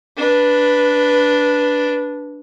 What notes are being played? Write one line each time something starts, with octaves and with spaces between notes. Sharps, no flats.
D4 B4